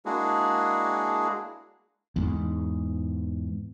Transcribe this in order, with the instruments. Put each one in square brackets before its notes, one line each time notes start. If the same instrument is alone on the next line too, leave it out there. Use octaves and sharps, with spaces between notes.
[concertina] G#3 A#3 D4 E4 F#4 G#4
[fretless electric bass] E2 G#2